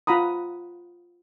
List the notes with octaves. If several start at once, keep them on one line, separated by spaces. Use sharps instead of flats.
F4 F#5 A#5 B5 D#6